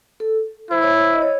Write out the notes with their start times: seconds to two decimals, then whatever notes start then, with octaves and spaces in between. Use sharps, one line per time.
0.20 A4
0.71 E4 C5
0.82 C#5
0.94 C5
1.13 D#5
1.22 C#5